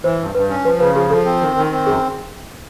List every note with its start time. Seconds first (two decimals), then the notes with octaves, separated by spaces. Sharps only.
0.04 E3 C5
0.20 G2
0.35 G2 B4
0.50 C#4
0.65 F3 B4
0.80 C#3 B4
0.95 F3 G#4
1.10 F3 A4
1.25 C4
1.41 D#3
1.57 D#3
1.71 C4
1.86 F#2 G#4